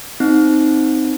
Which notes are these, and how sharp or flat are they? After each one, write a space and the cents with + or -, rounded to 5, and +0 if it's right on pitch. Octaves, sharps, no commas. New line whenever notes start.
C4 +0 D#4 +0